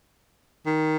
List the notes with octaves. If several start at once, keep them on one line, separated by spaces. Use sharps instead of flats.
D#3